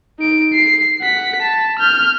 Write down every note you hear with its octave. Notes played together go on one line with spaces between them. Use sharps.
D#4 D7
C7
F#5 B6
A5
F6 G6